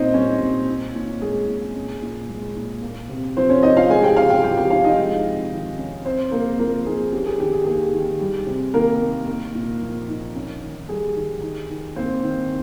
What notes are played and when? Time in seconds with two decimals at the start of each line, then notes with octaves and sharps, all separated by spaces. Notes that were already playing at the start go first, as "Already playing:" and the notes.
Already playing: A#2 C4 C#4 D#4 C5 D#5
0.14 G3 C#4 C#5
0.40 A#2
0.68 D#4
0.95 A#2
1.22 G#3 G#4
1.48 A#2
1.75 C#4
2.02 A#2
2.29 G#3
2.56 A#2
2.82 A#3
3.09 C3
3.37 F3 C4 C5
3.50 C#4 C#5
3.63 C3 D#4 D#5
3.76 F4 F5
3.90 G#3 G#4 G#5
4.03 G4 G5
4.17 C#3 F4 F5
4.30 G4 G5
4.44 F3 G4 G5
4.57 G4 G5
4.70 D#4 F4 F5
4.84 D#4 D#5
4.98 G#3
5.25 C3
5.52 D#3
5.78 C#4
6.05 C4 C5
6.31 C#3 A#3 A#4
6.59 F3 A#3 A#4
6.86 D#4 G#4
7.13 C#4 G4
7.26 G#4
7.40 D#3 G4
7.53 G#4
7.66 A#3 G#4
7.93 D#3
8.20 G3
8.47 C3
8.74 D#3 A#3 A#4
9.01 A#3
9.27 A#3
9.55 A#2
9.81 F3
10.08 D#4
10.35 C#4
10.62 D#3
10.89 G3 G#4
11.16 D#3
11.42 D#4
11.70 D#3
11.96 A#3 C4 C5
12.23 D#3